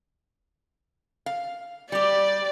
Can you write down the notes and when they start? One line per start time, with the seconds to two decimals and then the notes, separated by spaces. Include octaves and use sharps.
1.26 F5
1.92 G3 G4 D5